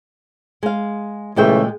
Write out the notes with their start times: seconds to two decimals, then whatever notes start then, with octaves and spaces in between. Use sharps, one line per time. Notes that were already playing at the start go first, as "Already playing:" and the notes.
0.63 G#3 F5
1.36 A#2 C#3 E3 G#3 A3 G5